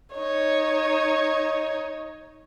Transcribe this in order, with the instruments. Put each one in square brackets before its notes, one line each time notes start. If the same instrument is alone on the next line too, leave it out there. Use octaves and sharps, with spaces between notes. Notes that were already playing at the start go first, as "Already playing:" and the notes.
[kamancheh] D#4 C#5